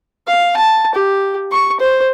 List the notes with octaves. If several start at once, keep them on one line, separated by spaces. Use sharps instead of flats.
F5
A5
G4
C#6
C5